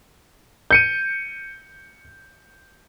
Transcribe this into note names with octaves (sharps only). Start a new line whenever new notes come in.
G6 C#7 D#7